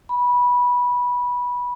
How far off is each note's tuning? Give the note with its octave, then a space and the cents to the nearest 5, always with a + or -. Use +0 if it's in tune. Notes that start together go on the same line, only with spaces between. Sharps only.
B5 -15